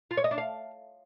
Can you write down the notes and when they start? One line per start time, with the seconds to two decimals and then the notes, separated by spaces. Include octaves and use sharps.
0.11 F4
0.17 C#5
0.24 D#5
0.31 D4
0.38 F5